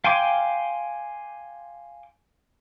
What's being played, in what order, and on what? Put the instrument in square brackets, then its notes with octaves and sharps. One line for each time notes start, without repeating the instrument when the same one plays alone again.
[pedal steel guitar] F5 G5 G#5 C6 D6